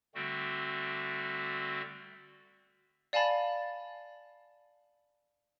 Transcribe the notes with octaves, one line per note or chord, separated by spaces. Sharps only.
D3 G3 A3 C4 F#4
D5 F5 G#5 A5 B5 A6